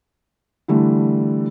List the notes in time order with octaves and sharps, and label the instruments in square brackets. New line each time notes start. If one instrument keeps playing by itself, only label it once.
[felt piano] D3 E3 G3 A3